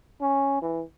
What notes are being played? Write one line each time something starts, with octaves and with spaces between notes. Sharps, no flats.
C#4
E3